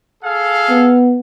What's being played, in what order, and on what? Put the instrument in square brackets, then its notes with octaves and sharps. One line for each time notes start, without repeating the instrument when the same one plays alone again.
[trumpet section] G#4 A4 F5
[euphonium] B3